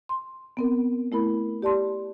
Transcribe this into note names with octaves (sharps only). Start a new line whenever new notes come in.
C6
B3 C4 A#4
A3 E4 A#4 B5
G4 D5 A5 C6